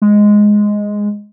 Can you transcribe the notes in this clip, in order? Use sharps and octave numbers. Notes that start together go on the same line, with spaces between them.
G#3